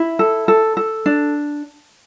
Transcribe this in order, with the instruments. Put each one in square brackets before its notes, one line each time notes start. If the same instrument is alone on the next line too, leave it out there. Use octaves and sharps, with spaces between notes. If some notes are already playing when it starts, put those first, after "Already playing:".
Already playing: [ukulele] E4
A4
A4
A4
D4